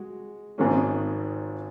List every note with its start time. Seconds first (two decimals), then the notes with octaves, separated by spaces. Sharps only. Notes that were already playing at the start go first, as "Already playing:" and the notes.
Already playing: G#3 F#4
0.58 G#1 G#2 D#3 A#3 C#4